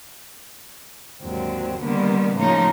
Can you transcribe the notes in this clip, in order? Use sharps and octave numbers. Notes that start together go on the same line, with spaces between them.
D#2 G#2 D3 F#3 C4
D3 D#3 G3 A#3 B3
A2 C#3 F3 A#3 D#4 C#5